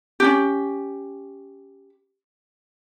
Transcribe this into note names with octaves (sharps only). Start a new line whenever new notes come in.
C#4 D4 G4